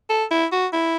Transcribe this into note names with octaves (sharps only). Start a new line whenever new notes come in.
A4
E4
F#4
E4